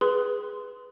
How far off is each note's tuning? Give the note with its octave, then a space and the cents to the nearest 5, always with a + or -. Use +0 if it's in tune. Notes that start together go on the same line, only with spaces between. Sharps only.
G#4 +0 B4 +0 C6 -20